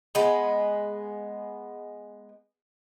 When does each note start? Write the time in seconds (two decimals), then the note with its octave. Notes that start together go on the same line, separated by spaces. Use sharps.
0.15 G#3 B3